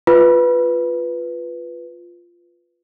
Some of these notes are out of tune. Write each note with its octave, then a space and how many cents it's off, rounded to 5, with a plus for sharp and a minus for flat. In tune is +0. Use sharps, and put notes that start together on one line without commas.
F4 +0 B4 +0